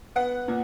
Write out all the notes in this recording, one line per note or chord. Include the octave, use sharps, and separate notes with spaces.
B3 F#5
A#2